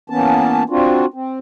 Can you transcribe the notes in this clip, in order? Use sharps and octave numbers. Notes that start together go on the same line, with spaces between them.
E3 A#3 B3 C#4 A5
C4 D4 F4 F#4
C4